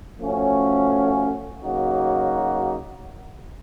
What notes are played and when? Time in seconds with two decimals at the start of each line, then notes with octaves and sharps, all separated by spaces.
0.20 F3 A3 C#4 F#4
1.63 C#3 F#3 A#3 D#4 F#4